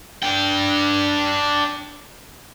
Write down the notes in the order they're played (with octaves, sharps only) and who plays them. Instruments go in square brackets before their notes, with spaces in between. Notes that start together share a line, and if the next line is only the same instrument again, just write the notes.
[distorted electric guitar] D4 G5